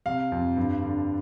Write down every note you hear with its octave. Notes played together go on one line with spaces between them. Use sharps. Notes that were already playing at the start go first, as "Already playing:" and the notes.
C3 F5
F2
G2
D3